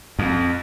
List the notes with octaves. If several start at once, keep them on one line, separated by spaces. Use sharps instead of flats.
F2